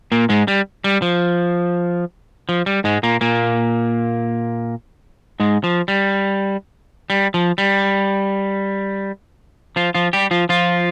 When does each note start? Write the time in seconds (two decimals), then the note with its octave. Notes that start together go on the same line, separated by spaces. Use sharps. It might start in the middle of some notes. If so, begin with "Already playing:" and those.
0.12 A#2 A#3
0.29 G#2 G#3
0.48 G3
0.84 G3
1.02 F3
2.49 F3
2.66 G3
2.84 G#2 G#3
3.03 A#2 A#3
3.21 A#2 A#3
5.40 G#2 G#3
5.64 F3
5.88 G3
7.10 G3
7.34 F3
7.58 G3
9.76 F3 F4
9.94 F3 F4
10.13 G3 G4
10.31 F3 F4
10.49 F3 F4